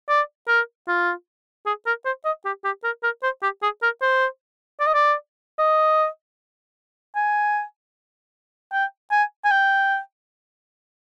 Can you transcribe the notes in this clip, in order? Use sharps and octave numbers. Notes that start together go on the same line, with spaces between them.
D5
A#4
F4
G#4
A#4
C5
D#5
G4
G4
A#4
A#4
C5
G4
G#4
A#4
C5
D5
D#5
D5
D#5
G#5
G5
G#5
G#5
G5